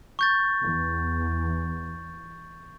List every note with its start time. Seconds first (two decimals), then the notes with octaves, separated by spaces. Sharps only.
0.19 C#6 G6 A6
0.62 E2